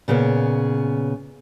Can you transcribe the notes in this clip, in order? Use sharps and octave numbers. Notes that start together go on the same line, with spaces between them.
A#2 C#3 B3 G#4